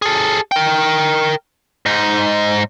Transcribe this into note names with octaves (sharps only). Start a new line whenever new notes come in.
G#4 A4
A#4 G5
G#2 D#4